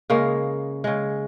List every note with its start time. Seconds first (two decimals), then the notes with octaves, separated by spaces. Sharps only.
0.10 C#3 G#3 A#3
0.84 C#3 G#3